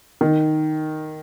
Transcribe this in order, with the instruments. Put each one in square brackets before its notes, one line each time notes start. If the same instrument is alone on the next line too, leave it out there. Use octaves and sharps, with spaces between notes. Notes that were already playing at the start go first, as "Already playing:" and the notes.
[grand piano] D#3